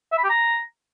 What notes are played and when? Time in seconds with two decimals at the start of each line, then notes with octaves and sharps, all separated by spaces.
0.12 E5
0.18 B5
0.24 G4
0.30 A#5